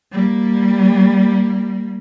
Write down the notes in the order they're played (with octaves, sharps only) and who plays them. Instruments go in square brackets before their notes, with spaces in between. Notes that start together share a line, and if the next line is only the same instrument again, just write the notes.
[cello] G3 A#3